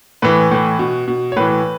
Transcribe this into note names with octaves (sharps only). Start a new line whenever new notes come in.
A2 E3 B4
A2 E3
B2
B2
C#5
A2 E3 B4